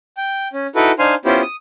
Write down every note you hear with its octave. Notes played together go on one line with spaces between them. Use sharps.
G5
C#4
D#4 E4 F#4 A4 B4
D4 D#4 C5 F5 G#5 C6
B3 C#4 E4 F4 G4 C5
D#6